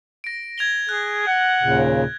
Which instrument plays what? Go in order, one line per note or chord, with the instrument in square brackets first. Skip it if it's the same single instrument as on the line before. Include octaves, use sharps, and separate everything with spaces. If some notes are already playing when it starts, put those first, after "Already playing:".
[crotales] A#6 D7
G#6 F7 G7
[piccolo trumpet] G#4 [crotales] F#6
[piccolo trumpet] F#5
[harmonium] D#2 A#2 C#3